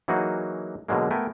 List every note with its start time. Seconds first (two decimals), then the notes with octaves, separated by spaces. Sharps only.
0.08 E3 F#3 A#3 D#4 F#4 G#4
0.88 B2 D3 F#3 G#3 A#3
1.11 A3 B3 A#4 G5 G#5